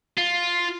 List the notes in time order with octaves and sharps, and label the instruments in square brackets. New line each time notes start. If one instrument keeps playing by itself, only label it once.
[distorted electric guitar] F4